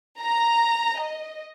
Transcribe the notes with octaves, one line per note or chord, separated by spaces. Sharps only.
A#5
D#5